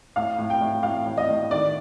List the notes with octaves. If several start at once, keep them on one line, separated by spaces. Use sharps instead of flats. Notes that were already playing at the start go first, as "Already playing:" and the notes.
A2 F5
A2
G5
A2
A2 F5
A2
D#5
A2
D#3 D5